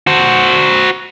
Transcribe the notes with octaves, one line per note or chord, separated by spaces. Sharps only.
F#4 C5